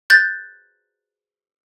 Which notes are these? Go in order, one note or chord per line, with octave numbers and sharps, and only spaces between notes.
F#6 G6 A6